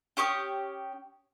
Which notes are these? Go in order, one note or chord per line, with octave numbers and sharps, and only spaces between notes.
C#4 G4 C#6 D#6